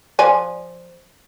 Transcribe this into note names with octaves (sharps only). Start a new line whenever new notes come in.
F3 D5 G#5